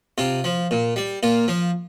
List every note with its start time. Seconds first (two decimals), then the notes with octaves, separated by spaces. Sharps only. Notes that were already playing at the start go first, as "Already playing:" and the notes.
0.18 C3 F4
0.44 F3
0.71 A#2
0.96 G3
1.23 A#2 F4
1.48 F3